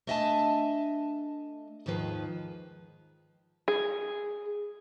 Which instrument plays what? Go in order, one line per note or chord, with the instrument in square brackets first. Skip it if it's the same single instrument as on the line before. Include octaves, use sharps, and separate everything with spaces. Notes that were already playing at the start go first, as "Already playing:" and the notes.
[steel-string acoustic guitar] A3 D4 D#5 E5 G#5 A5
D#2 G#2 D#3 F3 B4
[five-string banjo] G#4